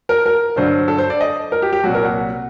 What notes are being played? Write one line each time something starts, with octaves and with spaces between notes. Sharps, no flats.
A#4
A#4
G2 D3 F#3 C5
A4
C5
D5
D#5
A#4
G4
G4
C2 A#2 F#3 F#4
A#4
F#5